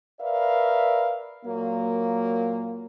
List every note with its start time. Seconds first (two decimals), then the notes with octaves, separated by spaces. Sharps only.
0.21 A#4 B4 D5 E5 F5
1.45 A#2 F#3 A#3